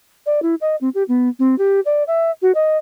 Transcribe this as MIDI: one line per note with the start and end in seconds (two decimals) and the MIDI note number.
0.26 0.40 74
0.42 0.55 64
0.61 0.75 75
0.81 0.89 60
0.94 1.03 67
1.08 1.29 59
1.39 1.57 60
1.58 1.80 67
1.85 2.03 74
2.07 2.31 76
2.42 2.52 66
2.55 2.77 75